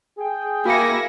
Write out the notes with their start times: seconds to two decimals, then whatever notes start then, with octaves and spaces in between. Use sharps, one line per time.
0.19 G#4 G5
0.66 A#3 E4 F#4 G#5 A#6 C#7